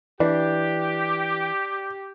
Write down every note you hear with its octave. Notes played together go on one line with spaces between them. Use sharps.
E3 D4 G4